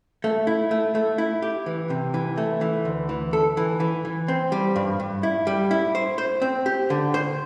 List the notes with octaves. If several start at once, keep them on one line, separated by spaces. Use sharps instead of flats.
A3
E4
A3
A3
E4
G4
E3
C3
E3
A3
E3
D2
E3
A4
E3
E3
E3
C4
G3
G2
G2
E4
G3
E4
C5
C5
C4
G4
D3
C5